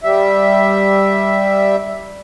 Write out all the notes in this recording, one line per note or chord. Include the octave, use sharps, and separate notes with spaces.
G3 E5